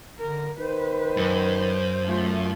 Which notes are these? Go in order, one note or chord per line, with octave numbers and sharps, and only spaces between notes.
D3 A#4
D#3 B4 C5
F#2
A3 F4